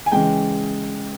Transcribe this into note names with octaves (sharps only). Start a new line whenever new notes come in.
G#5
C#3 E3 G#3 G5